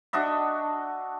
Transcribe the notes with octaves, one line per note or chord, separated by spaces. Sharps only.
D4 F#4 D#5 E5